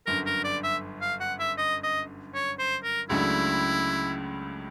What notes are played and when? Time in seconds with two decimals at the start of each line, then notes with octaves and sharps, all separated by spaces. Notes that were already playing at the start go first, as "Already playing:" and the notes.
0.06 G1 F#2 D3 A#4
0.26 A#4
0.44 D5
0.63 E5
1.01 F5
1.20 F#5
1.39 E5
1.58 D#5
1.83 D#5
2.34 C#5
2.59 C5
2.84 A#4
3.09 C#2 C#3 F#3 A3 D4 E4